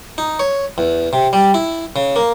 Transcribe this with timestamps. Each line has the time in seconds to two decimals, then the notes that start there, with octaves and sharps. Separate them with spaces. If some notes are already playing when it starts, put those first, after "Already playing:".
0.18 D#4
0.40 C#5
0.78 E2
1.13 C3
1.33 G3
1.54 E4
1.96 C#3
2.16 A#3